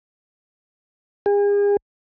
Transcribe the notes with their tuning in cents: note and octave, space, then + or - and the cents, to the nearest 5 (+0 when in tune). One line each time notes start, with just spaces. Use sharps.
G#4 -40